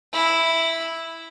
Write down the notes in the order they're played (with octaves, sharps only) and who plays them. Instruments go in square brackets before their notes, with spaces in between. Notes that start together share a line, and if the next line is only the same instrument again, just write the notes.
[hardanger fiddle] E4